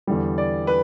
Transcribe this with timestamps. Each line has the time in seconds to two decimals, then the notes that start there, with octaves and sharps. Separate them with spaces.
0.07 E2 D3 G3
0.38 D5
0.67 B4